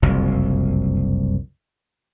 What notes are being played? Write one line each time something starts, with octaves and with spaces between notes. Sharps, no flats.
F#1 C2 F2